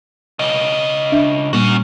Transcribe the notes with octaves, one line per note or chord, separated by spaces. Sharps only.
C#3 D#5
D4 E5
A#2 G3 A#3 C#4 F#4